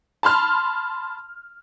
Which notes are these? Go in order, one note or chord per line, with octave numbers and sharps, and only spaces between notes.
A5 B5 C6 F6